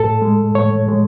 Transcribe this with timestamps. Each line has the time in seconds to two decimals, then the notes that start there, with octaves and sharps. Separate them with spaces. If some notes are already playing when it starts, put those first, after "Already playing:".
Already playing: A2 A4
0.22 G#3
0.55 A2 C#5
0.88 G#3